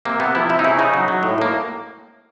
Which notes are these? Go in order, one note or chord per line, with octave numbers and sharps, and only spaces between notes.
C3 A#3
C3 B3
F3 E4
C3 E4
D#4
C#3 E4
C#3 D#4
F#3
F#3
A2
A2 A#3